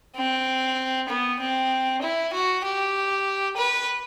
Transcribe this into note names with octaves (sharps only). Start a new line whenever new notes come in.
C4
B3
C4
E4
F#4
G4
B4